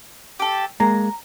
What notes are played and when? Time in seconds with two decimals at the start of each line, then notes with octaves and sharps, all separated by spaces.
0.39 G4 A4
0.80 G#3 A#3 A#5